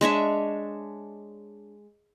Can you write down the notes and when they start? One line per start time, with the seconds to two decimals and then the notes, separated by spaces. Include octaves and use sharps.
0.01 G#3 D4 C#5 E5